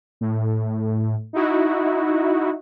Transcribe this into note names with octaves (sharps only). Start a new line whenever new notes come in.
A2
D#4 E4 F#4